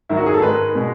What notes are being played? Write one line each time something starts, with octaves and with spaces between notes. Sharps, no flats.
G#2 D#3 F#3 E4
F#4
G#4
A4
G#2 D#3 G#3 B4
B2 G#3